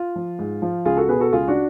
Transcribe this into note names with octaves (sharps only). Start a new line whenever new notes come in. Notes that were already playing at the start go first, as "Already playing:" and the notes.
Already playing: F4
F3
G#2
F3
C#2 F4 G#4
F#4 A4
B2 G#4 B4
F#4 A4
C#2 F4 G#4
D4 F#4